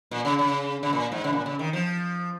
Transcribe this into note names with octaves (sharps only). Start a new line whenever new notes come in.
A#2
C#3
C#3
C#3
A#2
G#2
C#3
A#2
C#3
D#3
F3